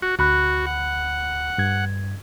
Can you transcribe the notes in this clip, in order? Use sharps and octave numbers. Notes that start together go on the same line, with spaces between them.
F#4
D2 F#4 B5 F#6
F#5
G2 G#6